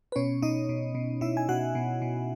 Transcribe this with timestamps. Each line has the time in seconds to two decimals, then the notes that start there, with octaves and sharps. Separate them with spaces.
0.12 B4
0.16 B2 C#4 C#5
0.42 B2 D#4 D#5
0.69 B2
0.95 B2
1.21 B2 E4 E5
1.37 G#5
1.49 B2 F#4 F#5
1.75 B2
2.02 B2